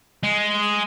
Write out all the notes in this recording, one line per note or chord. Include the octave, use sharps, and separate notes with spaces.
G#3